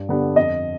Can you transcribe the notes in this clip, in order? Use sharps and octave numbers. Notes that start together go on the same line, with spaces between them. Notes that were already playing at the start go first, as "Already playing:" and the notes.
Already playing: G2
D3 G3 B3 D4
F2 D#5